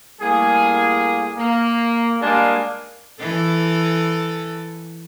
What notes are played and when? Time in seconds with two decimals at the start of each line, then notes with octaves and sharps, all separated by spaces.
0.21 A2 G3 A#3 G#4
1.38 A#3
2.22 G3 G#3 A#3 D4 G#4
3.20 E3 A4